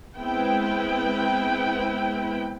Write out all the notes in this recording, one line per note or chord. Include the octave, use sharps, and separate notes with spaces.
G#3 B3 C4 E4 B4 G5